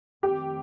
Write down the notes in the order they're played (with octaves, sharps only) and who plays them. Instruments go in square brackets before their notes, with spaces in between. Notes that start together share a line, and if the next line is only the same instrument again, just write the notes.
[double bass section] F2 D#3 A3 C4 [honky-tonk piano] G4